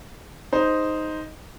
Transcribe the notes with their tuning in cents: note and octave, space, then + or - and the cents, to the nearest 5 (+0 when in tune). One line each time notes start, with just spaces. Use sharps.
D#4 +0 G#4 +0 C5 -5